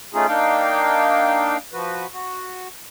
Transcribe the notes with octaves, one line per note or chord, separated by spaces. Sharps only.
A3 C#4 D#4 F4 G#4
A#3 D4 D#4 F5 G5
F3 F#4 B4
F#4